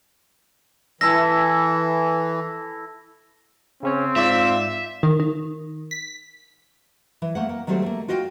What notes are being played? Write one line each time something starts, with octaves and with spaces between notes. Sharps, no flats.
E3 E4 A4 E5 A#6
C#3 C4 C#4 C#5
G#2 F4 D5 E5 B6
D#3
D#3
B6
E3
A3 A#3 F#5
A#3
D#3 F#3 G3 A3 C4 A4
A3 A#3
F4 F#4 D#5 F5 G5